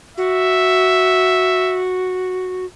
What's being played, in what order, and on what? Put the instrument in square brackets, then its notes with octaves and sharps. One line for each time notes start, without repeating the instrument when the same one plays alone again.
[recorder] F#4 [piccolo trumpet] E5